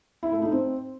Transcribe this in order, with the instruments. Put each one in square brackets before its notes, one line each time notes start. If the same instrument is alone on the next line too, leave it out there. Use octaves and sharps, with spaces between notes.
[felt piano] E4
A3
D#4
C4